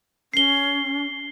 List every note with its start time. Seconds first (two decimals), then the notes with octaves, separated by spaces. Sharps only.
0.34 C#4 C7 G7